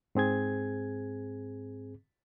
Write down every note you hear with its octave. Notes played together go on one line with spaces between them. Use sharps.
G#2 C4 G#4 G#6